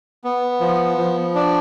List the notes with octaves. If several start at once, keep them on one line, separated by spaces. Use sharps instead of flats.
B3
F3
F3
D4